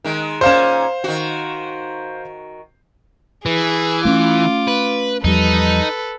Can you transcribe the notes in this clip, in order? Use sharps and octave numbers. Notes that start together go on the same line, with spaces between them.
D#3 G#3
A#2 C#4 C5 F5 E7
D#3 F#4
E3 G#4 B4
A3 A#3 C#4 F4 D6
B4
E2 F3 G3 D#4 A4 B4